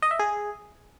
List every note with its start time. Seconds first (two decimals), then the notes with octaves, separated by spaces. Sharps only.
0.02 D#5
0.11 E5
0.19 G#4